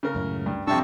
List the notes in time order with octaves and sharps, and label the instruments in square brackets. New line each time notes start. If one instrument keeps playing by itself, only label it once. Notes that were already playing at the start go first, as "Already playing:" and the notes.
[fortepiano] C#3 A#4
[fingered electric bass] C#2 F#2 A2
[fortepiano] G2
[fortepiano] F2 C3 G3 [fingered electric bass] D4 [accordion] A5 C#6 E6